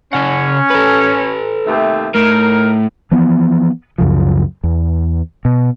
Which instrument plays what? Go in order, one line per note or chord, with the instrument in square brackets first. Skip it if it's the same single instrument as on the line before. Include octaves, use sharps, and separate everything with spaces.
[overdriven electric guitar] C#3 F#5 [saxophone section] C#4
[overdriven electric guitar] A4 B4
[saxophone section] D#2 C3 A3
[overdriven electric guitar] A2 [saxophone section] D#4 A#4
[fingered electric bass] E3 F3 B3
C#2 F#2 C#3 F3
E2
B2